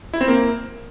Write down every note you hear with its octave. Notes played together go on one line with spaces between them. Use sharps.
E4
C4
A#3